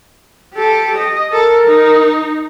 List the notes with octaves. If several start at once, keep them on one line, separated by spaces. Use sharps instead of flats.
G4 A4
D#5
A4 A#4
D#4